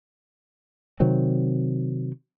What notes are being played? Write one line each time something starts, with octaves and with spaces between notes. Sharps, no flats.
C3 D#3 F#3 C4